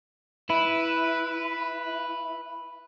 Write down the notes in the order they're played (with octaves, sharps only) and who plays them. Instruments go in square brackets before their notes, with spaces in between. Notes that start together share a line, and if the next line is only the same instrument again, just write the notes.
[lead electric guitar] E4 [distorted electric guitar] B4